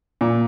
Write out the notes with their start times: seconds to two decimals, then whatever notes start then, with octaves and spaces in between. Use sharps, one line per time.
0.21 A#2